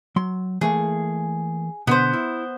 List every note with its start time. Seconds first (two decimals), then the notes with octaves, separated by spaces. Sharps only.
0.16 F#3 C6
0.61 E3 A3 A#3 G#4
1.87 B2 D3 B3 C5
2.13 E4